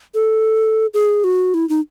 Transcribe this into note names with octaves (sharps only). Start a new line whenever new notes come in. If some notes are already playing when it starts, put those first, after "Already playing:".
A4
G#4
F#4
E4
D#4